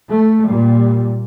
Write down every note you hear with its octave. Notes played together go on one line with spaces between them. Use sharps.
A3
A#2 G3